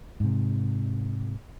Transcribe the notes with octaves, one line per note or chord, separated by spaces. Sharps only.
G#2 C3